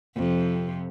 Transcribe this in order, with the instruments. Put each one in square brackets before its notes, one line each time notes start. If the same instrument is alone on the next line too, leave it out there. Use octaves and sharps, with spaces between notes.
[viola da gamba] F2 C3